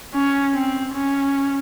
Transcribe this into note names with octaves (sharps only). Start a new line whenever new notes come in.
C#4
C4
C#4